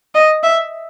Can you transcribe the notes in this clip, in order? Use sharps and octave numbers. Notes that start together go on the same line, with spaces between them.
D#5
E5